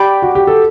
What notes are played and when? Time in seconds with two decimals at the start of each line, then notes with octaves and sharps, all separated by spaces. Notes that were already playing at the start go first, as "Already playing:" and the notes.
Already playing: G4 D5 G5 B5 D6
0.22 F#4
0.35 G4
0.47 A4